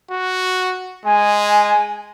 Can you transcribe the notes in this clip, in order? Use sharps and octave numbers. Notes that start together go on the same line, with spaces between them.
F#4
G#3 G#5